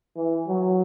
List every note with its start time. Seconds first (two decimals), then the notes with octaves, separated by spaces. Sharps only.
0.17 E3
0.48 F#3